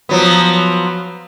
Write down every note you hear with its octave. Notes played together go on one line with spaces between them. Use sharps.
F3 F#3 B3